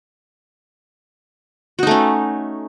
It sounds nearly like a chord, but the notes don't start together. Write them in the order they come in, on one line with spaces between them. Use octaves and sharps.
F#4 D#4 A3 C#4